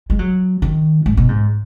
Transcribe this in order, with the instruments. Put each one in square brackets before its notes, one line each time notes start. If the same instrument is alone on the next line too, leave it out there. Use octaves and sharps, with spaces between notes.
[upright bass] G#3
F#3
D#3
G#2
B2
G#2